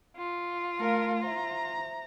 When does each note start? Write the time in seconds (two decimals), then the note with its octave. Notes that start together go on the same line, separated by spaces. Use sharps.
0.19 F4
0.80 A3 A#4 F5
1.23 C5 E5 A#5